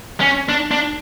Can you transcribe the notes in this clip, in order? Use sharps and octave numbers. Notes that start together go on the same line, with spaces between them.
C#4
D4
D4